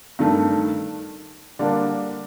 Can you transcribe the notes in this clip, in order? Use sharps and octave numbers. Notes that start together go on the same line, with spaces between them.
G2 D#3 A3
D3 G3 A#3 D4